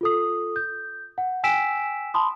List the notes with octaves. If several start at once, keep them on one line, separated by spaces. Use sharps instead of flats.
F4 A4 D#6
G6
F#5
G5 G#5 E6 B6 D7 E7
A5 B5 C6 D#6